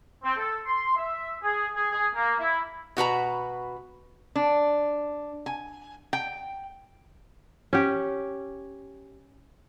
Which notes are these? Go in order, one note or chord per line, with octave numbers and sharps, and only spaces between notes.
C4
A4
C6
E5
G#4
G#4
G#4
A#3
E4
B2 F#4 B4 A#5
D4
G#5
G5
C#4 G4